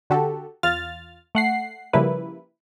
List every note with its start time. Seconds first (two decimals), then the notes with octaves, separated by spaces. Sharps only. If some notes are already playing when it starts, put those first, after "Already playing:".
0.10 D3 F#4 G4 A4
0.63 E2 F4 F6 A6
1.35 A3 F#5 C7
1.93 C#3 F3 G3 A#3 E4 B4